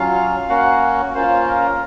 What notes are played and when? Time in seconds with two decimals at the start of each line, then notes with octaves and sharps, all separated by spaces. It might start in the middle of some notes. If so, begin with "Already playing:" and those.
Already playing: F#3 C#4 F4 F5
0.49 A#3 C#4 F#4 F#5
1.14 A#3 C#4 F4 C5
1.47 A#4